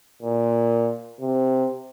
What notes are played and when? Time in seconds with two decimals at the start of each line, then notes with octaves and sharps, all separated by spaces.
0.22 A#2
1.21 C3